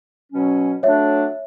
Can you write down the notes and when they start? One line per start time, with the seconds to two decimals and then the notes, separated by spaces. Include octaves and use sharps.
0.32 B2 F#3 C#4
0.83 F#3 A3 D4 A4 C#5 E5